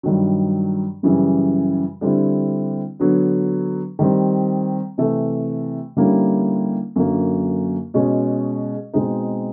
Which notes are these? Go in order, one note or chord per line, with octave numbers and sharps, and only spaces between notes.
G2 D#3 F#3
F#2 C#3 E3 G3
D3 G3 C4 E4
D3 F#3 B3
D#3 G3 C4
C3 E3 A3
D3 G3 A#3 C#4 E4
F#2 D3 F#3 A#3
B2 G#3 C#4
B2 G#3 C4 D#4